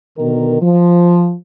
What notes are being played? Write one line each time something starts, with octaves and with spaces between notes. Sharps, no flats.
B2 D3 D#3 A#4
F3